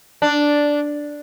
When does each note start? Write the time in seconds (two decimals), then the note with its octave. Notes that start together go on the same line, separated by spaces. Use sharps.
0.22 D4